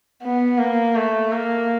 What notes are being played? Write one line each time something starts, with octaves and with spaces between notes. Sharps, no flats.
B3
A#3
A3
A#3